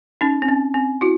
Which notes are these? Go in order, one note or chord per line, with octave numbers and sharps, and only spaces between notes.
C#4 D#4
C4
C#4
C4
E4 F#4